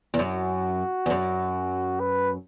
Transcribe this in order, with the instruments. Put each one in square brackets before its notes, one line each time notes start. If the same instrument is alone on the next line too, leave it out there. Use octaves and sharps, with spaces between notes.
[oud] E2
[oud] F#2 [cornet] F#4
[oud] E2
F#2
[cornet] B4